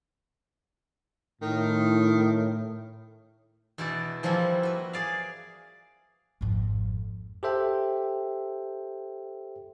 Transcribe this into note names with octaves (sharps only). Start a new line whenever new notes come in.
A2 D#3
E2 B2 E4 F#4 D5
E3 F3 G3 A#3 C4 E4
F#4 B4
G#4 D5 F5
G#1 F2
G4 A4 C5 E5 G5